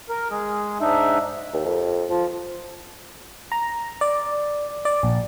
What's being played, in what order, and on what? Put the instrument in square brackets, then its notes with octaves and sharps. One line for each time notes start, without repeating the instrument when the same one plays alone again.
[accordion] A#4
G#3 G#4
G#2 D4 D#4 E5
[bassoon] D#2
F2
F3
[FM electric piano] A#5
D5
D5
A#1